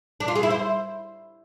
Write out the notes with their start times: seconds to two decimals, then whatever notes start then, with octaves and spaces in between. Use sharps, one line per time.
0.20 D4
0.28 F4
0.35 G#4
0.43 E4
0.51 C5